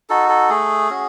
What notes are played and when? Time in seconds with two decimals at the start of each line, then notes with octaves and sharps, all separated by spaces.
0.09 D#4 F#4 A4
0.29 A4
0.50 A3 G#4
0.90 C#4 F#4